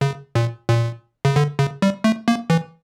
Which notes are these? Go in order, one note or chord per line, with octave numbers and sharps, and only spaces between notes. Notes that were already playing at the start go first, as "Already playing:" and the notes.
C#3
A#2
A#2
C#3
D3
C#3
G3
A3
A#3
E3